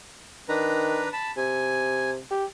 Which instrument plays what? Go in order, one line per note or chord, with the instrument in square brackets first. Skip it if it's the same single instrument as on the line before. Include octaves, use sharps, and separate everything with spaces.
[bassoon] D#3 [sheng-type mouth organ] D4 B4 A#5
[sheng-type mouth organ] A5 B5
[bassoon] C3 [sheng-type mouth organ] G#5
[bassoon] G4